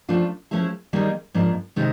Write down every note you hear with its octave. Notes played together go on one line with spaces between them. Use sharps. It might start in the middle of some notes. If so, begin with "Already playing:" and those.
F3 A3 D4 F4
F3 A3 C#4 E4 G#4
D#3 G3 A#3 D#4 G#4
G#2 F3 A#3 D4
C3 D#3 G#3 C4 D#4